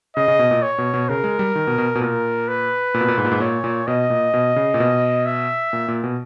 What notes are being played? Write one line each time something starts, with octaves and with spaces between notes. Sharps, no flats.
C#3 D#5
C#3
B2
A#2
C#5
B2
B2
C#3 A#4
G#3
G3
D#3
B2
B2
B2
A#2 A#4
B4
A#2
B2
A#2
G#2
A#2
G#2
A#2 C#5
A#2
B2 D#5
A#2
B2
C#3
A#2
B2
E5
A#2
A#2
B2